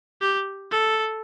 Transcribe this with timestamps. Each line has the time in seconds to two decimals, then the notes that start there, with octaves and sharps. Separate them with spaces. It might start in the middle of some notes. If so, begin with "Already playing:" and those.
0.21 G4
0.71 A4